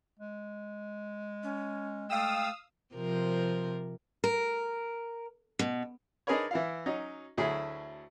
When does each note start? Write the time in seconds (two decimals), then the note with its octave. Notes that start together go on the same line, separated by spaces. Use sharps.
0.19 G#3
1.43 C#4
2.10 A3 F5 G5 D#6 E6
2.95 C3 F3 A#4
4.24 A#4
5.59 B2
6.27 D4 D#4 G#4 A#4 B4 C#5
6.51 E3 E4 F5
6.86 F#3 C#4 D#4
7.37 D2 F#3 A3 E4 G#4